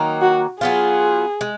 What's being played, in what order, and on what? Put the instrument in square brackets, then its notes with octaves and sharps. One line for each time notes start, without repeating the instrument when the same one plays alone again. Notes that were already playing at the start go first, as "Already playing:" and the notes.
Already playing: [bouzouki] D#3 F#3 A#3 D#4
[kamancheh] F#4
[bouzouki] F#3 B3 F4 [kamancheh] G#4
[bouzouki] G#3